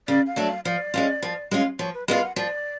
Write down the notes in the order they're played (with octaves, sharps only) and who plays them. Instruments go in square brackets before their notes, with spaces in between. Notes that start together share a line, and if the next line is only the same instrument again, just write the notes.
[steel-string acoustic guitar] C#3 [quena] D5
[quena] F5
[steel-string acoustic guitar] F#3 A3 D4
[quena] F5
[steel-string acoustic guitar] F3 [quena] D5
[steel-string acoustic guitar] G#3 C#4 F4
F3
G#3 C#4 F4
[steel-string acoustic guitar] F3 [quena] C#5
[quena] B4
[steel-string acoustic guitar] G#3 B3 F4 [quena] D5
[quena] F#5
[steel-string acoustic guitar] F3 [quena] D5